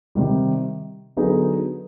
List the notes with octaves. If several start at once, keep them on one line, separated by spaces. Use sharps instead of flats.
C3 D#3 G3
D3 F#3 B3 D#4 G#4